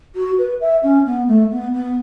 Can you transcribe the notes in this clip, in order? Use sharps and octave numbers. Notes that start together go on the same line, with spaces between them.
F#4
B4
E5
C#4
B3
A3
B3
B3